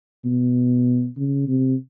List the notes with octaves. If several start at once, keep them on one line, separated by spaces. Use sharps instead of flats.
B2
C#3
C3